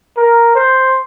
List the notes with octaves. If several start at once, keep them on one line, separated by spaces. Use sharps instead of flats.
A#4
C5